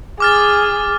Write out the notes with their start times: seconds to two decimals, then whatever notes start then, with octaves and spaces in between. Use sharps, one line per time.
0.20 G#4 D6 F6 A6